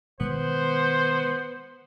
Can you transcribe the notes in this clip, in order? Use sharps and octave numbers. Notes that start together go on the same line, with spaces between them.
B2 D#3 G#3 B3 C5